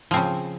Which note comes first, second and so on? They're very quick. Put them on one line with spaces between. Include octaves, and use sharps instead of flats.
F3 C4 C#3